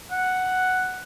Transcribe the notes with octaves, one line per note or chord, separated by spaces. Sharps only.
F#5